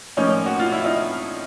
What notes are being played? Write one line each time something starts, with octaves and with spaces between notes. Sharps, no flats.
A2 F3 A#3 C#4 D#4
F#4
F4
E4
D#4 F4